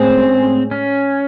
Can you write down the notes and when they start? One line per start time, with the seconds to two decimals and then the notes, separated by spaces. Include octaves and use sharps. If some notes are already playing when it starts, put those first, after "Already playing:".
Already playing: A2 G#3 C4 C#4 G#4 C5
0.71 C#4